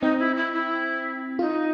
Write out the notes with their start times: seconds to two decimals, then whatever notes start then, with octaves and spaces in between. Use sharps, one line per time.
0.02 C4 D#4
0.19 E4
0.37 E4
0.53 E4
1.39 D#4 F4